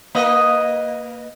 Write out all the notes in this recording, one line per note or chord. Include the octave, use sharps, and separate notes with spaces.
A#3 B4 D#5